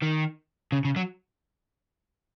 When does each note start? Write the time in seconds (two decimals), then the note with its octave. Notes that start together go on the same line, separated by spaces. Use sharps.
0.03 D#3
0.72 C#3
0.85 C#3
0.96 F#3